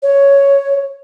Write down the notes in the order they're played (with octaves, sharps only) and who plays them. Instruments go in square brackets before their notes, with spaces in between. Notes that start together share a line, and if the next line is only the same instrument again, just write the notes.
[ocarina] C#5